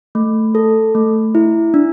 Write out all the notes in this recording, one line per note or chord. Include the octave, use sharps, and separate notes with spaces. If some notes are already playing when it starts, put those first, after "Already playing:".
A3
A4
A3
E4
D4